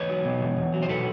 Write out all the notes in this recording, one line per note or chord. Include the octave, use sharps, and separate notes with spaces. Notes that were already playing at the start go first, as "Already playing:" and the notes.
Already playing: E2 B4 C#5
F#3
B2
E2
E2
F#3
C5
B2 A4 B4